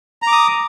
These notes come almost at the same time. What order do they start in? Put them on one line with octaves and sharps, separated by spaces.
A#5 D6 D#6